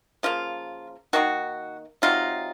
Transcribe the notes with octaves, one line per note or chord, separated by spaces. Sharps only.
C#3 F3 A#3 F4
D#3 A#3 D#4 F#4
C3 F#3 C4 D#4 F4